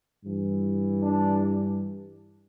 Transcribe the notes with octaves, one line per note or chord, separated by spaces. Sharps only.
G2 E3
D4